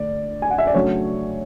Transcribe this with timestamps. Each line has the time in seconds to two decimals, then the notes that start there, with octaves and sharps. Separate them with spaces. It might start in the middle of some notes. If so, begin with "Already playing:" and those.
Already playing: D3 A3 D5
0.42 G#5
0.51 F#5
0.58 E5
0.67 D5
0.74 C#3 F#3 A3 D4 C#5